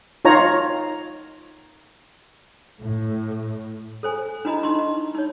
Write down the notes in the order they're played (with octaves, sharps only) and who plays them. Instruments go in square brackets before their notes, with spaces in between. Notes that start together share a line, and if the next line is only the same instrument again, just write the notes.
[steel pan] D#4 F4 C#5 A#5
[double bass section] A2
[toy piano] A4 C5 G#5
D4 E4 F#4 D#5 A#5 B5
D#4 D#5 C6 C#6
D#5
D#4 C#5